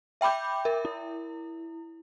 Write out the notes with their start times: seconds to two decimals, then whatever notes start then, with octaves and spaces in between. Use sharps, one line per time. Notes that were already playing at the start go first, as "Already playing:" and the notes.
0.21 E5 G5 B5 D6 G6
0.65 A#4 E5
0.85 E4